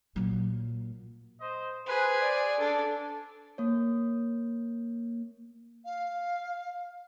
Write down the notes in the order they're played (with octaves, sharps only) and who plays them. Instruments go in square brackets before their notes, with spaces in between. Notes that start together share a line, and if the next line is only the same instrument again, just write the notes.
[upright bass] A#2 F#3
[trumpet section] C5 D#5
[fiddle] G#4 [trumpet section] B4 [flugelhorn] C5
[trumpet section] D5
[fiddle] D4 [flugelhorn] A4
[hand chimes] A#3 C#5
[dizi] F5